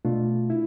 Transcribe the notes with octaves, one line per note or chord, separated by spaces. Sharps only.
B2 A3 D4 F4
E4